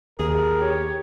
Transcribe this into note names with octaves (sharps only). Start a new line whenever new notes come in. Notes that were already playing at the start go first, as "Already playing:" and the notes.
D#2 G#4 A#4
G4 C#5